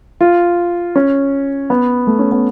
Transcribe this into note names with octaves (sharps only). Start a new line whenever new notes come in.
F4
C#4
B3
A3
C#4
B3